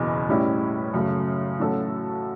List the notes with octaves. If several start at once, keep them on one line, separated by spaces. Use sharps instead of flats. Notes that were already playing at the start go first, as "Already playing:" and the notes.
Already playing: F#1 E2 B2
A2 G3 C#4 E4
F#2 C#3 F#3 A3
A2 F#3 C#4 F#4 A4